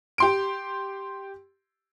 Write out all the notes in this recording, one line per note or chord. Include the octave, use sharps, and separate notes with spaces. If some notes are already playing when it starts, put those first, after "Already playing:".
G4 C6 D7